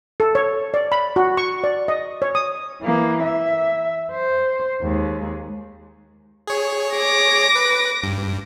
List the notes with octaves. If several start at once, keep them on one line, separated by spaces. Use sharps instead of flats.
A4
C#5
D5
B5
F#4
C#6
D5
D#5
C#5
D#6
E3 A#3
E5
C5
D#2 G#3
G#4 C#5
D6 A#6
B4
G2